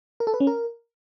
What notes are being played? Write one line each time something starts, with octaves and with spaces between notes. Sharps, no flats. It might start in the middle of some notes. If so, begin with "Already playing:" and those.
A#4
A4
B4
C#4
A#4